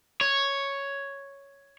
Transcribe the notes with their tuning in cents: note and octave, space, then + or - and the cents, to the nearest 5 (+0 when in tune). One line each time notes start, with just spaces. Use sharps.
C#5 +0